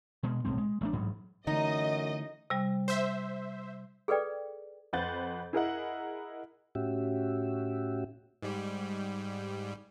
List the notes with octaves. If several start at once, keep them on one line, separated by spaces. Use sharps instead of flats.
B2 G#3
B1 A2 G#3 C4
G#3
A1 A3 D4
A1 G#2 F#3
F#2 D3 E3 A3 D#4 D#5
C3 G3
C5 E5
G#4 A4 B4 D5 G5
F2 B4 C5 F#5 G6 A6
E4 G#4 A#4 D#5 E5 F#5
A2 C#4 F#4 G4 E5
G#2 G3